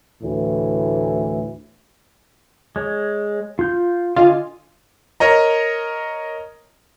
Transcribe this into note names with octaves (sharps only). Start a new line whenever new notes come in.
D2 A2 E3
G#3 C#5
F4 G6
D3 F4 D#5 G#5
A#4 C#5 D#5 A#5